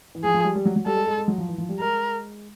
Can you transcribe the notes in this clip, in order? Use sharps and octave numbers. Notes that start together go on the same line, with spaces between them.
E3
F3 G#4
F3
G3
G3
F#3
F#3
G3 A4
G#3
G#3
G#3
F#3
F3
E3
F3
G3
G#3 A#4